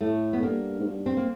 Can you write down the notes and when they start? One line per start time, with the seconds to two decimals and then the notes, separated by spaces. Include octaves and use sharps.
0.01 A2 A3
0.33 B3
0.43 G2 A#3
0.80 G#2
0.86 G2
1.06 C4
1.17 A#3